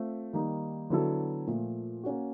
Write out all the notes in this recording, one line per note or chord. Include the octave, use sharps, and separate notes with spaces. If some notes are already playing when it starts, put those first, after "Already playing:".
Already playing: A3 C4 F4
D#3 G3 A#3 D#4
D3 F#3 B3 E4 A4
A#2 F3 A3
A#3 C#4 F#4